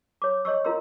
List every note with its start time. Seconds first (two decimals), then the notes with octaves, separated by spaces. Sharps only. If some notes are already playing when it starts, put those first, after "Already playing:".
0.22 C#5 D6
0.45 C#5 D#5 C#6 E6
0.64 E4 F4 A#4 D#5 C6 E6